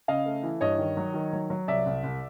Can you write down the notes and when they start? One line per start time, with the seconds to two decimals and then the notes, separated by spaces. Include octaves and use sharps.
0.08 C#3 D#5 F5
0.26 A3
0.43 E3
0.61 G2 C#5 D#5
0.79 D#3
0.97 F#3
1.14 D#3
1.33 F#3
1.50 F#3
1.68 C2 D5 E5
1.86 C2
2.03 C2